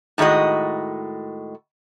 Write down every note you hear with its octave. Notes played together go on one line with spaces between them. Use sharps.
A2 D#3 G#3 F#4 D#5